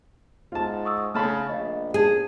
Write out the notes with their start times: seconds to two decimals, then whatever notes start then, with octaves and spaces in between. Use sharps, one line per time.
0.52 G#2 F4 A5
0.85 C#6 D#6 E6
1.14 C#3 A3 A5 B5 F6
1.49 A#1 D#5 F5
1.94 G#4 A5 G#6 D#7